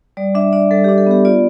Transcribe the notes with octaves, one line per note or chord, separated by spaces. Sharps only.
G3 D5
D4 E5
D4 D5
G3 A4
D4 G4
A4
B3 G4
F4 D5